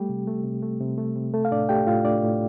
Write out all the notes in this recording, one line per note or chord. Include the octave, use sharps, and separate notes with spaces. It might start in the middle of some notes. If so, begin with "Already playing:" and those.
Already playing: G3 A3 G4
C3
A3
C3
A3
C3
A3
C3
A3 A4
F5
A2 D4 D5
A3 G4 G5
A2 F4 F5
A3 D4 D5
A2